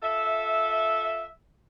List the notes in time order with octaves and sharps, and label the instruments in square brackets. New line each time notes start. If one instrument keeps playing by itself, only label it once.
[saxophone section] F4 A4 E5